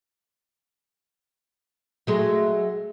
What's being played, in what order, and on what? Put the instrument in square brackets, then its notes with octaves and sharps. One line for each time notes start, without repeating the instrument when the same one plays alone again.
[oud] F#3 G#3 A3